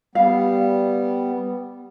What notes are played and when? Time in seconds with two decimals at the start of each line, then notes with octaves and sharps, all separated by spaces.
0.15 G3 B3 F5